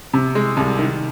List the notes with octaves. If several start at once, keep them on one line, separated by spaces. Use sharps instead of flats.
C3
G#3
C2
D#3